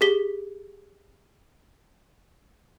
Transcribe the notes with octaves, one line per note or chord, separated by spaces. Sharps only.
G4 G#4 B6 G7